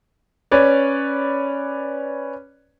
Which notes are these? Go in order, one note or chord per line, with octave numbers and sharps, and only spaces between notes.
C#4 B4 C#5 D5